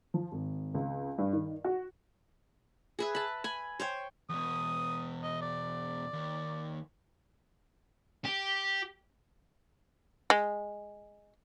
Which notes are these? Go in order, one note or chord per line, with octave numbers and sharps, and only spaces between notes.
F3
G#1
C#2
G2
D#3
F#4
G#4 B4 E5
A5 B5
G#5 B5
C5 C#5 G5
E2 B2 D#6
D#5
D5
D#2
G4
G#3